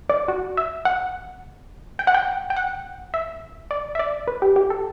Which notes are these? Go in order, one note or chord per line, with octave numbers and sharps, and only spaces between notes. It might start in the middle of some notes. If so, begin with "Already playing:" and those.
D5
F#4
E5
F#5
G5
F#5
G5
G5
F#5
E5
D5
E5
D5
B4
G4
G4
A4